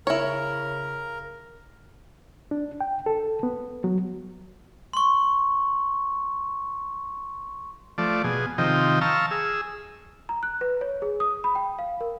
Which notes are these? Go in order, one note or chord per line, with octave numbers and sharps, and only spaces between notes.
C#3 E4 A#4 C#5
D4
G5
A4
B3
F#3
C6 C#6
F3 A3 D5
B2 G#4
C3 D#3 F3 D#5 G5
F5 A5 A#5 C#6 E6
G#4 E6
A#5
F#6
B4
C#5
G#4
D#6
B5
G5
F5
A#4